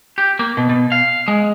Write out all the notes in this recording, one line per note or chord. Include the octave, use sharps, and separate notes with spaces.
G4
A#3
B2
B2
F5
G#3